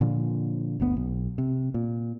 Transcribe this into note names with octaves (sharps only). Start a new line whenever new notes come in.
A#2 D3 F3
G1 D2 B3
B1
C3
A#2